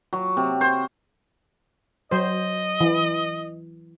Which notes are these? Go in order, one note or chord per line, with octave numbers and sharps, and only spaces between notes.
F#3
C3
C5
F#3 C5 D#5
E3